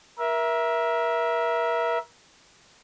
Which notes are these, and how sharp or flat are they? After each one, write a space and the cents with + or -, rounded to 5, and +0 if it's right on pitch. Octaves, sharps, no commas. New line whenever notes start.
A#4 +30 E5 +0